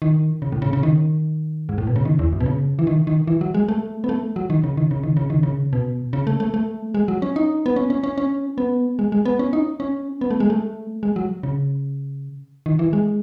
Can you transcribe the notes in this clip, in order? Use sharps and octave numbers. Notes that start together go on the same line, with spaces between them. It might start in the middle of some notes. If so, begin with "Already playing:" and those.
D#3
C#3
A2
C#3
C#3
D#3
G#2
A2
B2
C#3
D#3
E2
F#2
B2
C#3
E3
D#3
D#3
E3
F#3
G#3
A3
B3
A3
F#3
D#3
C#3
D#3
C#3
D#3
C#3
D#3
C#3
B2
C#3
A3
A3
A3
G#3
F#3
C#4
D#4
B3
C#4
C#4
C#4
C#4
B3
G#3
G#3
B3
C#4
D#4
C#4
B3
A3
G#3
A3
G#3
F#3
C#3
D#3
E3
G#3